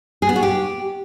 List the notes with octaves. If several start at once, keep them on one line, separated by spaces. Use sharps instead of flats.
G#4
B3
F#4
G4